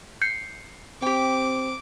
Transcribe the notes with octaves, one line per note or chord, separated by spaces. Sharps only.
G6 C7 C#7
C4 G4 G5 D6